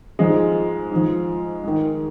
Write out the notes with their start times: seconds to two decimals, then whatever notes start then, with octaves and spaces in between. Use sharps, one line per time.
0.19 G#2 F3 G#3
0.91 G#2 F3
1.64 G#2 D#3